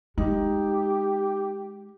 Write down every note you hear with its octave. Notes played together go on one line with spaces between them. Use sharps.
G#3 D#4 G4